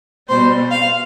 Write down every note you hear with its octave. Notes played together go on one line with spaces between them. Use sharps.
B2 G3 C4 C5
F5